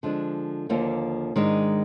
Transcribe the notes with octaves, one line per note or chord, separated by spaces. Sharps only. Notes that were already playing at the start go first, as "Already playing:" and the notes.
D3 F3 G#3 D4
D#2 D3 F3 A#3
G#2 D#3 G#3 D4